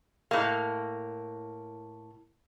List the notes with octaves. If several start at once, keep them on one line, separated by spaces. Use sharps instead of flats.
A2 A#3